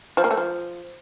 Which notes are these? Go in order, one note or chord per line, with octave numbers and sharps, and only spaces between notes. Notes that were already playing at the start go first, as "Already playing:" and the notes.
F3
A#3
A3
F3